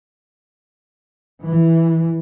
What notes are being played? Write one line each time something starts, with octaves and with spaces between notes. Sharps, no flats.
E3